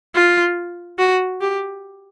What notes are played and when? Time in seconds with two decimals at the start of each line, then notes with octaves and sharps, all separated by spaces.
0.15 F4
0.99 F#4
1.41 G4